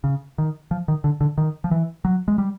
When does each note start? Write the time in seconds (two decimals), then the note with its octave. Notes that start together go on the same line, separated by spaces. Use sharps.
0.04 C#3
0.38 D#3
0.71 F3
0.88 D#3
1.04 D3
1.21 D3
1.38 D#3
1.64 F3
1.71 E3
2.05 F#3
2.28 G#3
2.38 G3